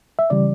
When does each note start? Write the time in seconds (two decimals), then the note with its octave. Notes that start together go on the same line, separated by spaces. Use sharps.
0.19 E5
0.30 C#3 E3 G3 D5